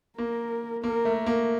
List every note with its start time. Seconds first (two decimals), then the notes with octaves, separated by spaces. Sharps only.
0.18 A#3 A#4
0.84 A#3 A#4
1.05 A3
1.26 A#3